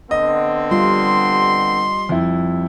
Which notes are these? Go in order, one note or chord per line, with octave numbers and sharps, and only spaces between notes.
D3 B3 C4 D#5
G3 F4 C6
F2 E4